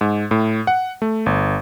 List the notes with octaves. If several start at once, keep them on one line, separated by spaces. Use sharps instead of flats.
G#2
A2
F#5
A3
G1